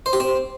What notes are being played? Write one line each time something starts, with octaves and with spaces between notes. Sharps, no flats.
C5
G4
C4